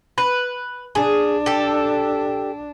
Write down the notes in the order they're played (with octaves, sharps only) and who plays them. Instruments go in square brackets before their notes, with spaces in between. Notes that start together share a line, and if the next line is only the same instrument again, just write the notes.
[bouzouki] B4
[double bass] D4 [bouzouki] G#4
[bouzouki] G4 A4